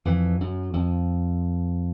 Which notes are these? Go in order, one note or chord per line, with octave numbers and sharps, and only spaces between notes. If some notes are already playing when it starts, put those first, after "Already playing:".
F2 E3
F#2
F2